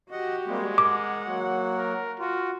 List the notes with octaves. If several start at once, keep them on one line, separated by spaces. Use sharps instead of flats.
F#4 G4 D#5 F#5
G3 G#3 A#3 C4
A#4 F#5 D6
F#3 A#3 F#4
A#4
F4 F#4